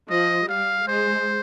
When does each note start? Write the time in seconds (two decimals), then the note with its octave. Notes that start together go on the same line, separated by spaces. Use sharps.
0.10 F3 D#5
0.48 G3 F5
0.87 G#3 C5